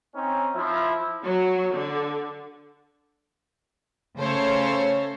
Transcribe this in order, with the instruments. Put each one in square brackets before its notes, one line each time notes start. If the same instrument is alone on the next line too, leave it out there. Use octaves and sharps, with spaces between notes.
[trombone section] C4 C#4 D#4
F3 E4
[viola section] F#3
D3
[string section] C#3 A3 A4 C5 C#5